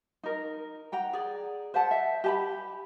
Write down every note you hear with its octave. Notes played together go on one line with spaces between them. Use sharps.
D#4 A#4
F#5 G5 A#5
G#4 D5
C5 E5 F#5 A5
E5
G4 A5 B5